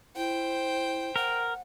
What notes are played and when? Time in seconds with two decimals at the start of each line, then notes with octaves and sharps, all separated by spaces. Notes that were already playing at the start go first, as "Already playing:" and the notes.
0.16 E4 C5 G5
1.16 A#4 F#5